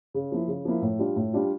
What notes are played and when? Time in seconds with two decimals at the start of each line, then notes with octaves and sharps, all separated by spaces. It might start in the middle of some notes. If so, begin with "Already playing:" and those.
0.14 C#3
0.32 F3 A#3 E4
0.48 C#3
0.65 F3 A#3 E4
0.82 A2
0.99 G3 D4 F4
1.16 A2
1.33 G3 D4 F4